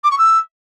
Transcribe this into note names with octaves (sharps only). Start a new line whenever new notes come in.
D6
C#6
E6